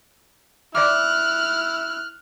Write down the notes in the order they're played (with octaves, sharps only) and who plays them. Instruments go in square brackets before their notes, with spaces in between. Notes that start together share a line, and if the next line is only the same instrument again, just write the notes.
[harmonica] E4 [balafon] D5 E5 D6 [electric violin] F6 F#6